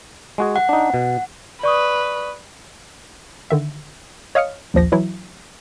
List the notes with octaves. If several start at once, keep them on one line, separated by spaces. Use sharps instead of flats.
G#3 F#4 G#4
F#5
D4 D#4
B2
B4 D5 C#6 D#6
D3 D#3 E5
C#5 D#5 F5 D#6 F6 C#7
A#1 D#2 F3 A#6
E3 F#3 E4